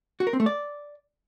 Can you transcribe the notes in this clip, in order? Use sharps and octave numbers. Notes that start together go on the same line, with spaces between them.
F#4
A#4
C4
A3
D5